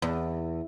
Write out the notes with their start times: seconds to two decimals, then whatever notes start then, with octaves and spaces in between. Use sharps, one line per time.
0.02 E2